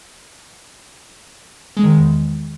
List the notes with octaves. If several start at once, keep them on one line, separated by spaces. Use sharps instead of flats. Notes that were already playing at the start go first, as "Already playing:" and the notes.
G#3
D#3
G#3
E2